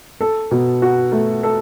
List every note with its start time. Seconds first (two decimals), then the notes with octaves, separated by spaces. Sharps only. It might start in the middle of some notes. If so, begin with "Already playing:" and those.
0.21 A4
0.51 B2
0.82 F#4
1.12 A3
1.43 A4